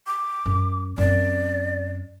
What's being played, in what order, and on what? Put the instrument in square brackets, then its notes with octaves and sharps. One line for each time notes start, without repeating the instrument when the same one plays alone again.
[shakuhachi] D6
[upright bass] F#2
[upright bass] F#2 C4 [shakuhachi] D5